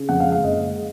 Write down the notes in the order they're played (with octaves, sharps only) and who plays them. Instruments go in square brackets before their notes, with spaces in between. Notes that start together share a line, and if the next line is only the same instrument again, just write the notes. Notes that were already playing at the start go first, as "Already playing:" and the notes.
Already playing: [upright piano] C#3
F2 F#5
F5
G#3
F5
F#1 D#5
G#3